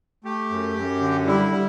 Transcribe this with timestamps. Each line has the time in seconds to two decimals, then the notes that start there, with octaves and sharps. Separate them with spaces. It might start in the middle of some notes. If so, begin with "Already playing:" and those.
0.24 A3 G4
0.51 F#2
0.76 F#2
1.01 D3
1.27 G3 E4
1.51 G3